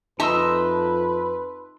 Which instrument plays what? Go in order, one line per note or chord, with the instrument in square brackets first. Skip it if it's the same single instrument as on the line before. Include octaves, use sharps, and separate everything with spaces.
[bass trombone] F2 [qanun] D#4 E5 [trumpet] B4 [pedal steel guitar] A5 C6 E6